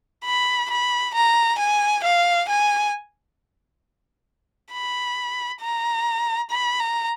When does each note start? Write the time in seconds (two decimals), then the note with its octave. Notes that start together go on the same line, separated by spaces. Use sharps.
0.25 B5
0.70 B5
1.15 A#5
1.59 G#5
2.04 F5
2.49 G#5
4.72 B5
5.61 A#5
6.50 B5
6.80 A#5